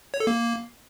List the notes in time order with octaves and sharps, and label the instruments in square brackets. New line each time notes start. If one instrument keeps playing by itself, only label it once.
[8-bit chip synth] C#5
A4
A#3